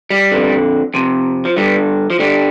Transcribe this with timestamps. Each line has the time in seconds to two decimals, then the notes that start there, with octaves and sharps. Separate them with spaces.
0.10 G3
0.31 F2 D3
0.94 F2 C3
1.45 F3
1.56 G2 D3 G3
2.10 F3
2.19 G2 D3 G3